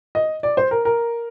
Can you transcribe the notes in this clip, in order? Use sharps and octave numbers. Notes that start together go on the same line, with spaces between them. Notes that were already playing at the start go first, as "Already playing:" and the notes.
D#5
D5
C5
A#4
A#4